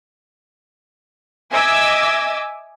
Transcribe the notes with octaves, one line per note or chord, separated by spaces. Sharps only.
D#5 E5 G#5 D6 E6 G#6